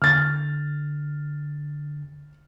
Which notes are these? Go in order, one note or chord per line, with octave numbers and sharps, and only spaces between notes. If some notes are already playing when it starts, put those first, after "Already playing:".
D3 F6 A6